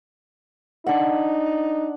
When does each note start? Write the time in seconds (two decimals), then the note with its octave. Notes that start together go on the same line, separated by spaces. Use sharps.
0.86 D4 D#4 F#5